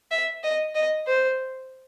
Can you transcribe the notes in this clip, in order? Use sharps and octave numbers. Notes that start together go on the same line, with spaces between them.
E5
D#5
D#5
C5